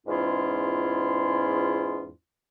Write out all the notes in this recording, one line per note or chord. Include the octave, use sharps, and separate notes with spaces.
E2 G#2 C#4 E4 F4